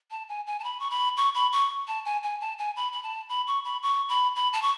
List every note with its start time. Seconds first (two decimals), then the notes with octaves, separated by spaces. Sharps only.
0.11 A5
0.29 G#5
0.47 G#5
0.59 A5
0.64 B5
0.80 C#6
0.90 B5
1.17 C#6
1.35 B5
1.53 C#6
1.88 A5
2.05 G#5
2.23 G#5
2.41 A5
2.59 G#5
2.76 B5
2.92 B5
3.03 A5
3.29 B5
3.47 C#6
3.65 B5
3.83 C#6
4.09 B5
4.36 B5
4.53 A5
4.62 C#6